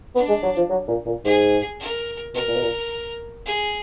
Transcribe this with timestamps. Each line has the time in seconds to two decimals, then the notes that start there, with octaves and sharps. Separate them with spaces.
0.15 B3 D4
0.28 G#3
0.43 F#3
0.57 F3
0.70 F#3
0.88 A#2
1.06 A#2
1.25 G#2 G#4
1.80 A#4
2.34 B2 A#4
2.48 A#2
2.56 B2
2.62 A#2
3.45 G#4